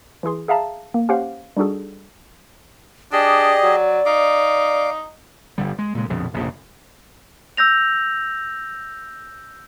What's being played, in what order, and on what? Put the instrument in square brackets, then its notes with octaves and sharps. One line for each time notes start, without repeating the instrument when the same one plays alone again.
[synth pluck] E3 E4 G#4 C6
G#4 E5 F5 A5 A#5
A#3
C#4 G4 C5 F5 F#5
G3 D4 D#4 F#4 G#4 A4
[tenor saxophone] D4 [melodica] G4 G#4 D#5 [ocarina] D5
[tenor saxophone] F#3
[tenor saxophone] D#4 [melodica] F5 D6
[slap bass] G1 D3 G3
G#3
A#2 C#3 G#3
A#1 F2 B2 D3
F1 A#1 F2 C#3
[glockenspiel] E6 G6 A#6 F7